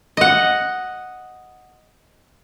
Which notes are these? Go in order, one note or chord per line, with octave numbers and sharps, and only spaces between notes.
D#5 F#5